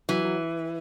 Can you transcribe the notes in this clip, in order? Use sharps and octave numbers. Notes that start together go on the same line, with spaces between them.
E3 F#3
F#3